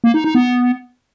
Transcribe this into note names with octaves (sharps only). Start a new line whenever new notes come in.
A#3
D#4
D#4
B3